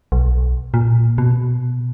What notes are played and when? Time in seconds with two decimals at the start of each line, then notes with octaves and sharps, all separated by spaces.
0.12 B1
0.74 A#2
1.18 B2